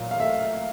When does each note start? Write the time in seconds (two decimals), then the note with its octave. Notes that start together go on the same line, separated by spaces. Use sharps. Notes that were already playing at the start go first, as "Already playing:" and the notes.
Already playing: A#2 F#3
0.11 F5
0.20 A3 E5